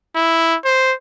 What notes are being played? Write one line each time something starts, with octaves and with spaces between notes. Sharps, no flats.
E4
C5